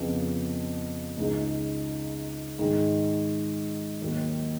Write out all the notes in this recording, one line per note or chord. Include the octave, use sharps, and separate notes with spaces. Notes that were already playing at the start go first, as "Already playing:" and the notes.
Already playing: F2 C#3 F3 B3
C#2 C#3 G#3 D#4
G#2 D#3 G#3 D#4
D#2 D#3 F#3